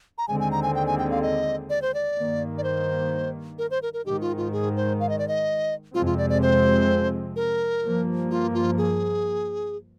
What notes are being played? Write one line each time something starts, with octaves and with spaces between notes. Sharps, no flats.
A#5
D#2 D3 G#3 C4 G#5
G#5
A#5
G#5
G5
G#5
G5
F5
D#5
D5
C5
D5
G2 D#3 A#3
D5
C5
A#4
C5
A#4
A#4
G#2 D#3 G#3 G4
F4
F4
G#4
C5
F5
D#5
D5
D#5
F2 C3 F3 G#3 C4 F4
F4
D5
D5
C5
A#4
G2 F3 A#3
F4
F4
G#4